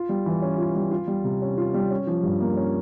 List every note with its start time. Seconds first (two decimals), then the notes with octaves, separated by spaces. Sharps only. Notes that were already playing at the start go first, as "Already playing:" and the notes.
Already playing: F4
0.09 G3
0.26 E3
0.42 C#4
0.58 F4
0.76 G3
0.91 F4
1.07 G3
1.24 C3
1.42 C#4
1.58 F4
1.74 G3
1.90 C#4
2.07 F3
2.23 G2
2.41 A#3
2.57 C#4